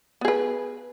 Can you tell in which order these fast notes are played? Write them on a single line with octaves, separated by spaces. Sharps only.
B3 G#4 B4